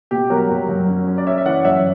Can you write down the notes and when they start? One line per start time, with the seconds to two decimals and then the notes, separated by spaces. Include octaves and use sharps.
0.11 B2 G4
0.30 F#3 F#4 A#4
0.49 F#2
0.69 F#2
0.88 C#4
1.08 C#4
1.18 D5
1.26 C#4 C#5 E5
1.38 E5
1.45 E3 D5 F#5
1.65 F#2 C#5 E5